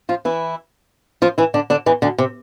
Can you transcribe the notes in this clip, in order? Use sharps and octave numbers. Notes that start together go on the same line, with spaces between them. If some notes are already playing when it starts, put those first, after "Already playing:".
F3 F4
E3 E4
F3 F4
E3 E4
D3 D4
D3 D4
E2 E3
D2 D3
C3